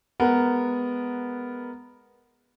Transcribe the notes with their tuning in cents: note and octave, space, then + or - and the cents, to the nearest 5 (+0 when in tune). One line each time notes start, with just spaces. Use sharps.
G#3 +0 B3 +0 A#4 +0